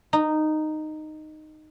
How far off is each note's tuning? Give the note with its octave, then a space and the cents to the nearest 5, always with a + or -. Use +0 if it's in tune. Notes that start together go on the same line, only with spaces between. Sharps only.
D#4 -10